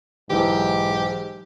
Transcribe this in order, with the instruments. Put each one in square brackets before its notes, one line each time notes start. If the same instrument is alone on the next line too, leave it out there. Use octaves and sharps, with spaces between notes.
[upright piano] B1 E3 [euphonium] G#2 [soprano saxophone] G4